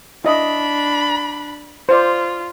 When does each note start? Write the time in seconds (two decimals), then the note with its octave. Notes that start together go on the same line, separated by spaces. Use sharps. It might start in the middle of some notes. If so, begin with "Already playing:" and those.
0.25 D4 E4 D#5 B5
1.89 F4 C5 D5